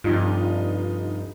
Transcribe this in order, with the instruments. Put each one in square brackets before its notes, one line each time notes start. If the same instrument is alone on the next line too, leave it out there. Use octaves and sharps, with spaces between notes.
[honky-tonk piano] F1 D#4 F4 [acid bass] G2